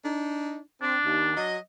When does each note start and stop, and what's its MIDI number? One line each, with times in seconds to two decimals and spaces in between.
0.04 0.58 62
0.04 0.58 63
0.82 0.97 60
0.82 1.45 62
1.05 1.34 39
1.37 1.56 54
1.37 1.56 75